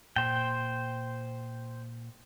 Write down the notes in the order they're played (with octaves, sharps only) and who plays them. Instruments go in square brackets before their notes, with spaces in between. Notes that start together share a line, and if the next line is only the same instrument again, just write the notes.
[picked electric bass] A#2 [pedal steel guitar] C5 G5